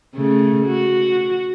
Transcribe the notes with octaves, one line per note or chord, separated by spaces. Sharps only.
C#3 A3
F#4